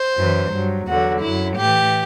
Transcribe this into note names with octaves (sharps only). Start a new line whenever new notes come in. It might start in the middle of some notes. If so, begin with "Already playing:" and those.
Already playing: C5
F#2 E3
G2 F#3
E2 D3 F#3 F#4
F#2 F#3 E4
A2 E3 G4